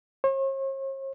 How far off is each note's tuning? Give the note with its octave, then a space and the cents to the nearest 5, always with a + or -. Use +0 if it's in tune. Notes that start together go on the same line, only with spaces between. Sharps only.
C#5 -45